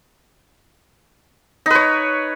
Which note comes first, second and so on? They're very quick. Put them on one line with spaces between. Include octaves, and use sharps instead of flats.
D#4 B4 C#5